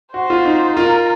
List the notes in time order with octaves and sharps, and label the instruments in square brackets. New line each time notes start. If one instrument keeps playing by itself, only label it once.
[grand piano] F#4 [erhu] C5
[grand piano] F4
D#4
[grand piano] F4 [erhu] A#4